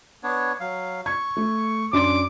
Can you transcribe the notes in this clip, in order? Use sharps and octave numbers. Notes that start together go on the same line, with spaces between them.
B3 D4 C#5
F#3 F5
C#6 G#6
A3
F#2 D4 C6 D6